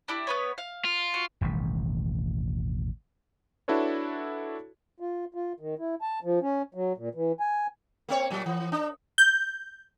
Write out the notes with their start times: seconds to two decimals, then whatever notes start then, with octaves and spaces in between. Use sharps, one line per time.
0.08 D4 E4 G4
0.27 B3 B4 C#5
0.58 F5
0.85 F4
1.14 F#4
1.41 E1 A1 D#3 G3
3.68 D4 E4 F#4 A4 B4 C#5
5.00 F4
5.34 F4
5.60 D#3
5.79 E4
6.02 A5
6.23 F3
6.42 C#4
6.75 F#3
6.97 A#2
7.15 E3
7.40 G#5
8.09 A#3 C4 C#5
8.30 A#2 F#3
8.46 E3
8.72 D4
9.18 G6